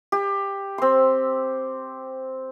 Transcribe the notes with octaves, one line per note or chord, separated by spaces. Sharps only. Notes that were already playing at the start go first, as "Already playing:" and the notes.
G4
C4 C6